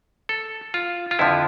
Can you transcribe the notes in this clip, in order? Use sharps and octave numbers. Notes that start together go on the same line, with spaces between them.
A4
F4
F4
F2 D3 F3 E4